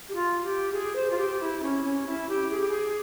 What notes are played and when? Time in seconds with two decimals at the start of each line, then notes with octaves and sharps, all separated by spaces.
0.08 G4
0.14 F4
0.43 G4
0.72 G#4
0.95 C5
1.10 F4
1.17 G4
1.40 E4
1.62 C#4
1.83 C#4
2.06 E4
2.28 G4
2.50 G#4
2.60 G4
2.68 G#4